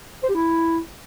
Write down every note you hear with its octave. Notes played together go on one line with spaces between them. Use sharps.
C5
G4
E4